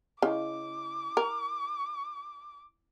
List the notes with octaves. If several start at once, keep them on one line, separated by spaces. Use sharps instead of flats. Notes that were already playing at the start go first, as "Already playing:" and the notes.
C#3 E4 D#5 D6
A#4